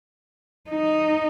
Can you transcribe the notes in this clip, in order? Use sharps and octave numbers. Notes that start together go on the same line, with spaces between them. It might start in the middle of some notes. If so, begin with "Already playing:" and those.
D#4